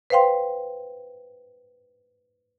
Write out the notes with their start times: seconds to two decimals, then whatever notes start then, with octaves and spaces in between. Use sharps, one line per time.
0.10 B4 C5 F5 G5 C6